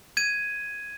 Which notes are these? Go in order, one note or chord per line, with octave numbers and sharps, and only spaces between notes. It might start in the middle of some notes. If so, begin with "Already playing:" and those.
G#6 D#7